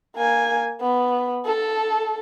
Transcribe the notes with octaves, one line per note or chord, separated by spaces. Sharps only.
A#3 G#5
B3
A4